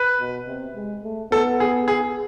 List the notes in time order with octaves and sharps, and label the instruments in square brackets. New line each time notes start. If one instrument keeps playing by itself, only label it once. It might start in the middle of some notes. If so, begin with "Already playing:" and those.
Already playing: [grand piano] B4
[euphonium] B2
C3
G#3
A3
[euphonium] B3 [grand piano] A4
[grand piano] G#4
G#4